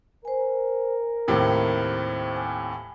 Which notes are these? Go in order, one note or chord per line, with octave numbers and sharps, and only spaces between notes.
A#4 C5 G#5
D#2 A2 C3 C5
G#5